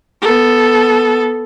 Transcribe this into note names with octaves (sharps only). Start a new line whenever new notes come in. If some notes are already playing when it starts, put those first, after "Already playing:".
B3 A4